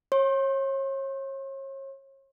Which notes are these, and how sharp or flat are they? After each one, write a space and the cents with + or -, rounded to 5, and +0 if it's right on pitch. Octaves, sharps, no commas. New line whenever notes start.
C#5 -35 C6 +40